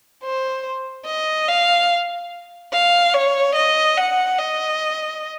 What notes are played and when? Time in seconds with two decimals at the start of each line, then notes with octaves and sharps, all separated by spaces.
0.23 C5
1.06 D#5
1.48 F5
2.73 F5
3.14 C#5
3.55 D#5
3.97 F#5
4.39 D#5